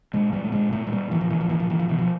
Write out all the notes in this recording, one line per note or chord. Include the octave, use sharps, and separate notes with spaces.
A#2 G#3
A#2 G3
A3
A#2 G#3
A#2 A3
G#3
A#2 G3
A#2 E3
F3
A#2 E3
F3
A#2 E3
F3
A#2 E3
F3
B2 E3
F3